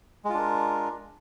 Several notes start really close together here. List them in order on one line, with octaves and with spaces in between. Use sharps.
G#3 F4 D4 A#4